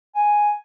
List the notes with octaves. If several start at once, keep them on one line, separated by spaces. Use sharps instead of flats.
G#5